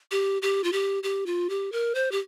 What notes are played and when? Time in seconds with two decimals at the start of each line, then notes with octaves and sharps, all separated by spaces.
0.11 G4
0.42 G4
0.64 F4
0.72 G4
1.03 G4
1.26 F4
1.49 G4
1.72 A#4
1.95 C5
2.11 G4